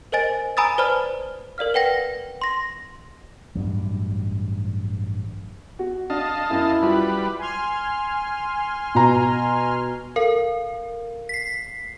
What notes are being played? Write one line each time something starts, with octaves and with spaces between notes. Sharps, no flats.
A#4 C5 D#5 G#5 A6
G#5 A#5 B5 D#6 E6 A6
B4 C5 D5 A5 B5 F6
A#4 D5 F5 F6
B4 F#5 G5 A#6
C6 A#6
A1 G2 F#3
F#4
D4 D#5 F5 A5
F#2 E4
G3 F4 F#4 B4
G#5 C6 F6
B2 A#5
A4 A#4 F5
B6 C7